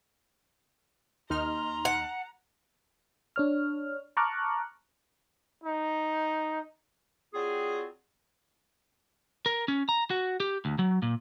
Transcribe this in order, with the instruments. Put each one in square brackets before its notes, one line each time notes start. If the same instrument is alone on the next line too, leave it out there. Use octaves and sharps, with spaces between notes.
[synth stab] D#2 D#4 F6 [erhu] A#5 [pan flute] C6
[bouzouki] F#5
[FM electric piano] D4 C#5 F6
A5 A#5 C#6 D6 F6 F#6
[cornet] D#4
[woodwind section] F#3 G3 C4 F4 F#4 G#4
[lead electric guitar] A#4
C#4
A#5
F#4
G4
D2
F#3
A#2